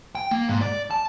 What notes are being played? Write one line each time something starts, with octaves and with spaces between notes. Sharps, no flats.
G5
A#3
G#2
D5
A5